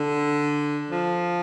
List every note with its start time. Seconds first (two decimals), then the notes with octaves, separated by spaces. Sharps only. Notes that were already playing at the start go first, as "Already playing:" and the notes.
Already playing: D3
0.91 F3